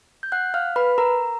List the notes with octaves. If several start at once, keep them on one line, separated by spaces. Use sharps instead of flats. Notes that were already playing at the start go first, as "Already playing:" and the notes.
G6
F#5 F#6
F5 F6
B4 B5
A#4 A#5